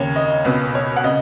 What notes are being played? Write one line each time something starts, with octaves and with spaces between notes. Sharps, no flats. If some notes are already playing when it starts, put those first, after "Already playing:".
Already playing: D#2 C#3 C#5
D#5
C#2 B2 B4
C#5
F#5
C#3 D#5